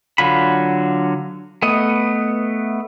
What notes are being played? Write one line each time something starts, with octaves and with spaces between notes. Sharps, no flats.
D3 F#3 F4 B5
A3 B3 D#5